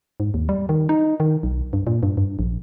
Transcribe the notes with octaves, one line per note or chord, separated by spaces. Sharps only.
G#2
D#2
G3
D#3
D#4
D#3
B1
G2
A#2
G2
G2
A#1